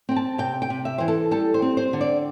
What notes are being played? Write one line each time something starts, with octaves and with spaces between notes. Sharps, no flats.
C4 G5
A5
C3 G5
G5
C3
E5
E3 C5
A4
G3 A4
C5
C4
C5
D3
D5